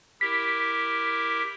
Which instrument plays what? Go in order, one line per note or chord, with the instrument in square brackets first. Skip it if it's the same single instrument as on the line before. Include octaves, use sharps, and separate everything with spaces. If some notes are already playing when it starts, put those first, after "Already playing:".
[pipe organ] E4 G4 A#4 [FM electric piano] B6